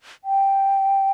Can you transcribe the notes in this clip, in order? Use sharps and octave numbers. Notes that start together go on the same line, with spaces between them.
G5